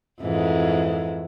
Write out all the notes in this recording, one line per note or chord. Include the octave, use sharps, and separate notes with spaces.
F2 G#2 E3